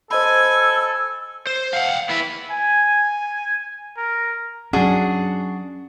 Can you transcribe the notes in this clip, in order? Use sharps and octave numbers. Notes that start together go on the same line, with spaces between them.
A4 C5 D#5 G#5 B5 E6
C5
F5 F#5
B3 E4
G#5
A#4
F#3 C#4 D4 F#4 G#4